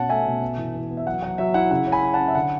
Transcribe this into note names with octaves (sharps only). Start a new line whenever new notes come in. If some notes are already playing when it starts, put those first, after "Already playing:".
Already playing: B2 C#4 F#5 A5
A3 E5 G#5
B2
B3
E3
E3
B3
E5
F#3 F#5
F#3 F#5
F#3 E5
E4 F#5
C#3 F#5
C#4
G#5 B5
E4
F#5 A5
C#4
E5
D3 F#5